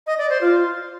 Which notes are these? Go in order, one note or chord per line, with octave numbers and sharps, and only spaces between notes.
D#5
D5
C5
F4